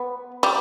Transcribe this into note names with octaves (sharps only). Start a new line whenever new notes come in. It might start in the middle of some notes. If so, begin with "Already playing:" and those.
Already playing: B3
G3